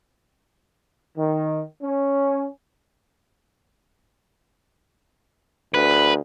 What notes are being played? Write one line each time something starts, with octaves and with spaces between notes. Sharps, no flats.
D#3
C#4
D2 B4